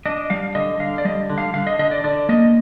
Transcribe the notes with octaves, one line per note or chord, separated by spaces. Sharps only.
D4 D#5
G3 F5
D3 D#5
D3 F5
D5
G3 D#5
D3
F5
D3 F5
D#5
D3 D#5
D5
D3 D5
A#3 D#5